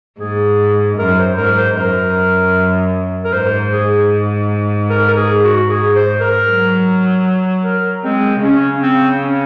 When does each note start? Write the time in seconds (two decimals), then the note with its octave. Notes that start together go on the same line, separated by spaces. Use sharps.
0.20 G#2 G#4
0.98 F#2 A#4
1.18 C5
1.37 G#2 A#4
1.57 C5
1.76 F#2 A#4
3.24 A#4
3.33 G#2 C5
3.73 G#4
4.90 A#4
5.08 A#4
5.16 G#4
5.43 F#4
5.69 G#4
5.95 C5
6.20 A#4
6.47 F#3
7.64 A#4
8.04 G#3 C4
8.42 C#3 C#4
8.82 C4
9.22 C#4